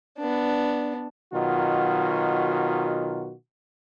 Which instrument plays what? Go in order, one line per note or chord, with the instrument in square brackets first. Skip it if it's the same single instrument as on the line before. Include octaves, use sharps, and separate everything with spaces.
[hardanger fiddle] B3 D4
[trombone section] B2 D#3 F#3 F4 F#4